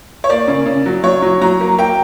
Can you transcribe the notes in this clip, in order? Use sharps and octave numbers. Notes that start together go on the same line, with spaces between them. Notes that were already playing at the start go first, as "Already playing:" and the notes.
C#5
A#3 D5
C#3
C#3
F#3
F#3 C#5
F#3
F#3 A#5
A#3
A#3 G5